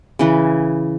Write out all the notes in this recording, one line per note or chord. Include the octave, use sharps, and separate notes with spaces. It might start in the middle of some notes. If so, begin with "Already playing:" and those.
C#3 E3 B4